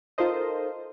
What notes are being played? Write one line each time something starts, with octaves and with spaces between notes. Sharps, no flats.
D#4 F4 A4 A#4 C5 D#5